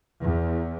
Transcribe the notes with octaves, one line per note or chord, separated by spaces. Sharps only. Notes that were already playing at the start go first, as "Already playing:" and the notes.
E2